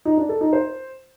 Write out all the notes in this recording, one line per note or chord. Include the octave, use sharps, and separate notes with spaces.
D#4
D4
A4
D#4
C5